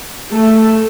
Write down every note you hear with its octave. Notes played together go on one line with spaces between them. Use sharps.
A3 A4